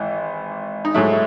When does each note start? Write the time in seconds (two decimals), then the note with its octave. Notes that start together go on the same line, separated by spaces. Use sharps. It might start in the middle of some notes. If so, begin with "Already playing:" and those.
Already playing: G#1 G#2 E3
0.85 D#4
0.94 G#2 F#3 A3 E4